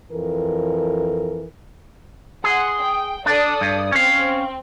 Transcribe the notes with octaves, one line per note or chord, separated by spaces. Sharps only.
F2 E3 A4 A#4
G#4 F#5 C6
G5
D4 A4 D5 D#6
G2
C4 C#4 F5